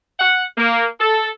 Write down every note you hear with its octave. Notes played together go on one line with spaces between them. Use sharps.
F#5
A#3
A4